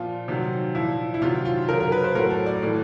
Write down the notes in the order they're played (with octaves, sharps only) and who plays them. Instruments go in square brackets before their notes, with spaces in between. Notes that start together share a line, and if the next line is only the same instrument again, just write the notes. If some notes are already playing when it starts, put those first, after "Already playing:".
Already playing: [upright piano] A#2 F3 F4
C3 D#3 F#3
A#2 F3 E4
E4
C3 D#3 F#3 F4
F4
C#3 A#4
F#3
A#4
B4
C5
A2 F#3 A#4
A4
D5
A2 E3